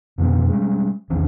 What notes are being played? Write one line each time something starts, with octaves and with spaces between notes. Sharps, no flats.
F2 B2 D3 B3
G3 G#3 C#4
A#1 E2 D#3 C#4